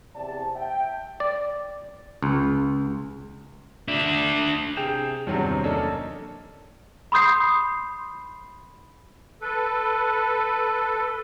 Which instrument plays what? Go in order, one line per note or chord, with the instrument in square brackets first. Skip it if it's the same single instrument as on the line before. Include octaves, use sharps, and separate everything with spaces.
[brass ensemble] E2 C3 D5 A5
E5 G5
[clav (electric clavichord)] D5
C#2
[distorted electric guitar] D4 E5
[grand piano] C3 G#4 G5 G6 E7 F7
E2 G2 C3 D#3 F#3 C4
A#3 C#4 D4 A4 C#5 D#5
[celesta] B5 C6 D#6 G6 C7
[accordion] A4 B4